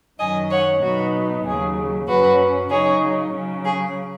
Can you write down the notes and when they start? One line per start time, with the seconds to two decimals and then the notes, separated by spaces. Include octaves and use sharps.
0.19 F#2 D#3 F#3 C#4 D#5 G#5
0.51 C#5 F#5
0.82 B2 F#3 B3 D#4 F#4
1.45 D#2 C#3 F#3 G#4
2.08 F#2 F#3 C#4 F#4 B4
2.70 C#3 F#3 D#4 G#4 C#5
3.33 C#3 F#3 C#4
3.64 G#4